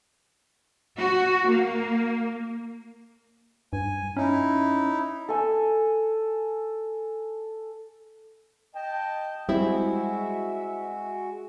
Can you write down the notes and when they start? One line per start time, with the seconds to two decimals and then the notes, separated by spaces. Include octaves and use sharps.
0.98 F#4
1.49 A#3
3.73 G2 G#5
4.17 C#4 D#4 E4
5.28 A4 G#5
8.75 D#5 G5 A5
9.49 G3 G#3 C4 E4 F#4 E5